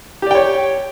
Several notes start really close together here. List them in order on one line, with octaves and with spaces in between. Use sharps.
G4 D5 G5 C#5